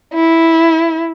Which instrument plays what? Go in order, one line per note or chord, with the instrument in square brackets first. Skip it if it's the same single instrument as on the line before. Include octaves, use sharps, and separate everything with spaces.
[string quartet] E4